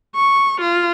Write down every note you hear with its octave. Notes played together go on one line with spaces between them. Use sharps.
C#6
F4